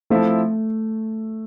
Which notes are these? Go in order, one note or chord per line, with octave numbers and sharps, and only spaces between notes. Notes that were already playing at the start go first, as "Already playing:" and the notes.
F3 A3 C4 E4 A4